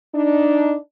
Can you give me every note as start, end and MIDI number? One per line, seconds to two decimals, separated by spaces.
0.15 0.74 62
0.15 0.74 63